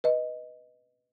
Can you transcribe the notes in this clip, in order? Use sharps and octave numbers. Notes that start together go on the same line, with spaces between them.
B4 D#5